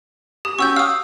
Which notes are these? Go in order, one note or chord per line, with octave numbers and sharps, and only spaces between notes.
G4 D#6
C#4 F#4 G4 C#6 E6 G6
F5 D#6 E6